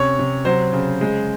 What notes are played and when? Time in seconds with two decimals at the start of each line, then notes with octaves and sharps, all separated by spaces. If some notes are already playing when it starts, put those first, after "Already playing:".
Already playing: C3 C#4 C#5
0.19 C3
0.45 F#3 C5
0.73 C#3
1.01 G#3